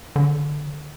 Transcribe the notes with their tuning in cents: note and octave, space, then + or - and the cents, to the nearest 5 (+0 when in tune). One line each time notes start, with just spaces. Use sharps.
D3 +10